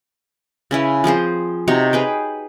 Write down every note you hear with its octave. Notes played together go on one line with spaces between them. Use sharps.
C#3 C#4 E4 B4
F3 C4 G#4 C5
C3 D#4 F#4 C#5
G#4 B4 G5